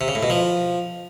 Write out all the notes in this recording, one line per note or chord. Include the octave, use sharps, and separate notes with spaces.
C3
C#3
A2
B2
F3